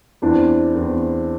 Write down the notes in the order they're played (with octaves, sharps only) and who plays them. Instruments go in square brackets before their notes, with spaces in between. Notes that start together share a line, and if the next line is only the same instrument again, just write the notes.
[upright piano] E2 E3 C4 D4
E2 E3 C4